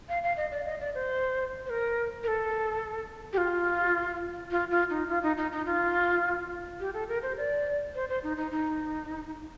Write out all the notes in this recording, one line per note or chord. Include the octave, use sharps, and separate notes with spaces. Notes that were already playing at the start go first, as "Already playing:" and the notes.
F5
F5
D#5
D5
D#5
D5
C5
C5
A#4
A#4
A4
G4
F4
F4
F4
D#4
F4
D#4
D#4
D#4
F4
G4
A4
A#4
C5
D5
C5
C5
D#4
D#4
D#4